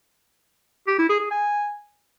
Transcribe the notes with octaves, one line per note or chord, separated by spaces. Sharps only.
G4
E4
G#4
G#4
G#5